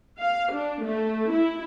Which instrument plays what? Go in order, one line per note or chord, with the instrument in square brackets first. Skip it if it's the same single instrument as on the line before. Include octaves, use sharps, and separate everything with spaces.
[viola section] F5
D4
A3
E4